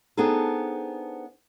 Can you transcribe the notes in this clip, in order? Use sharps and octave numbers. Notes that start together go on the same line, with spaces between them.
B3 C4 D4 D#4 G#4 A4